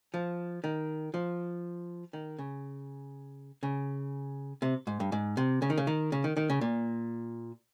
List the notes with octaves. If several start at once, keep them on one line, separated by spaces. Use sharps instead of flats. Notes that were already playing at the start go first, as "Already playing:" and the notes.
F3
D#3
F3
D#3
C#3
C#3
C3
G#2
G2
G#2
C3
C#3
D#3
C#3
D#3
C#3
D#3
D#3
C#3
A#2